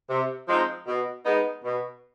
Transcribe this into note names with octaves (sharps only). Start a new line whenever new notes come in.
C3
F3 G#3 C4 D#4
B2
G#3 B3 D#4
B2